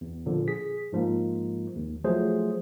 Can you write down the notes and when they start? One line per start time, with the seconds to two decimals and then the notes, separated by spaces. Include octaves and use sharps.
0.01 E2
0.26 A#2 D3 F3
0.48 G#4 B6
0.93 G#2 F3 G#3 A#3
1.76 D#2
2.04 F3 F#3 A3 G#4 C5